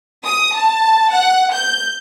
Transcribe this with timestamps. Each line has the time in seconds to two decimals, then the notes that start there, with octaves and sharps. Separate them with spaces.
0.24 D#6
0.54 A5
1.11 F#5
1.52 G6